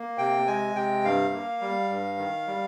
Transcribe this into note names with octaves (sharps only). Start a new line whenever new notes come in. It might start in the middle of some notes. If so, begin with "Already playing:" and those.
Already playing: A#3
C3 G5
G#3 G#5
C3 G5
G2 F5
A#3
G3
G2
D#3
G3